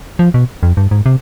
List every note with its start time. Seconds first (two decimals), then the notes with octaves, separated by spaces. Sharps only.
0.19 F3
0.34 B2
0.63 F2
0.77 G2
0.91 G#2
1.06 C3